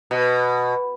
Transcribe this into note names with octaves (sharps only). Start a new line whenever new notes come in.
B2